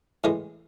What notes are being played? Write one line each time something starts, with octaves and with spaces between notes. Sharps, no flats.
A2 E3 G#3